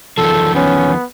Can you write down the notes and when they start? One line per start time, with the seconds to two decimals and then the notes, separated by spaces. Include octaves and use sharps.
0.18 E2 D#3 F3 A4
0.55 B3 C#4